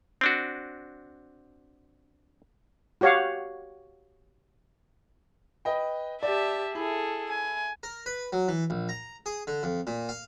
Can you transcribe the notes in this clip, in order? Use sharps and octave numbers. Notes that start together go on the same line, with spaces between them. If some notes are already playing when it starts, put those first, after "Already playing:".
C4 D4 F#4
F#4 G4 C#5 F5 F#5
B4 D#5 G5
G4 D5 E5 A5
E4 G#4 A4
G#5
A#4
B4
F#3
E3
A#1
A#5
G#4
D3
F2
A#2
F5